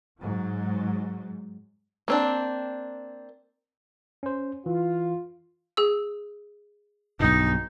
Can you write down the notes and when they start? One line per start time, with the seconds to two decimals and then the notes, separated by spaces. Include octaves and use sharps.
0.19 G#2 F#3
2.08 A#3 C4 D4
4.23 C#4 C5
4.66 E3 F4
5.77 G#4 E6
7.20 B1 G2 B2 D#4